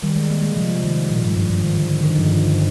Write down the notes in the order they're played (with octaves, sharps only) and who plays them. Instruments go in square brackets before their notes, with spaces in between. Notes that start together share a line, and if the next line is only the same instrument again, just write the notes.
[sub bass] D#3 [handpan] G3
[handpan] G#3
A#3
G#3
[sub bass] C3 [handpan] F3
[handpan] D#3
[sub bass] A#2 [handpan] F3
[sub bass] G#2 [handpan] G3
[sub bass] G2 [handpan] F3
[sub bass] G2 [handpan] F3
[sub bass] G#2 [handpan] D#3
[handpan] D3
D#3
D3
D#3
[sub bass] G2 [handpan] F3
[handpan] D#3
D3